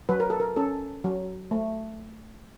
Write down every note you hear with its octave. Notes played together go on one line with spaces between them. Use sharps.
F#3 B4
A#4
A4
A#4
C#4 A4
F#3
A3